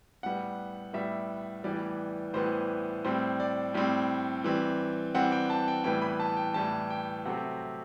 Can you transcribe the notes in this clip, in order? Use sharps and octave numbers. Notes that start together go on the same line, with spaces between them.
A2 G3 B3 F#5
A2 G3 B3 E5
A2 E3 G3 B3 D5
A2 E3 G3 B3 C5
A2 G3 C4 C5
D5
A2 G3 C4
E3 G3 C4
E3 G3 C4 F#5
G5
A5
G5
A2 E3 G3 B3 G5
B5
A5
G5
A2 E3 G3 B3 A5
G5
C3 F#3 A3 C4 F#5